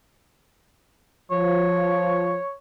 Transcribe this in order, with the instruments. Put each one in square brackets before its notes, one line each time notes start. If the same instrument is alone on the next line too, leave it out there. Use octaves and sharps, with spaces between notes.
[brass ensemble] F3 [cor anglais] C#5